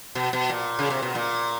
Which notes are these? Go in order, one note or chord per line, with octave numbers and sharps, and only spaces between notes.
B2
B2
A#2
C#3
C3
B2
A#2